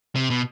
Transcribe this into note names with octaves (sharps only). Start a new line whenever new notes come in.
C3
B2